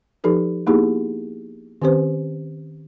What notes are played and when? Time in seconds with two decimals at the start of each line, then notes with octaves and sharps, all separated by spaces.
0.24 F3 D#4 G4 A4 B4
0.67 A#3 B3 D#4 E4 G4 G#4
1.82 D#3 C4 C#4 G4 B4 C5